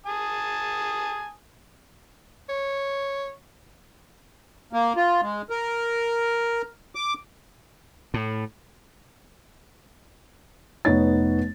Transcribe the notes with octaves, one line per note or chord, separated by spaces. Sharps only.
G#5 A5 D#6
C#5
A#3
F4
G#3
A#4
D6
A2
F1 B3 D#4 C#5 A6